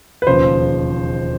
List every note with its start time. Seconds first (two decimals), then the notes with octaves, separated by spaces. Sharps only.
0.22 B4
0.27 E1 D#2 C#3 F3 C5